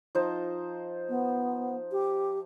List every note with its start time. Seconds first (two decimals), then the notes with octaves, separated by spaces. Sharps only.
0.15 F3 D#4 C5
1.09 B3
1.92 G4